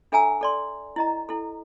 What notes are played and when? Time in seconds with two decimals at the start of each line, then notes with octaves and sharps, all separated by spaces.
0.12 D4 A4 E5 G#5 A#5 E6
0.41 A4 D5 C6
0.96 E4 D#5 A#5
1.29 E4 A4